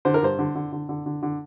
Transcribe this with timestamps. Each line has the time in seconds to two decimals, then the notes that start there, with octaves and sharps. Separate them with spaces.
0.05 D3 C5
0.14 A#4
0.23 G2 C5
0.39 D3
0.55 D3
0.72 D3
0.89 D3
1.06 D3
1.23 D3